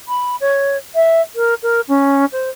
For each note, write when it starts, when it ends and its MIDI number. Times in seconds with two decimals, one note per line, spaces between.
0.08 0.36 83
0.40 0.77 73
0.95 1.21 76
1.35 1.54 70
1.62 1.81 70
1.88 2.25 61
2.32 2.49 72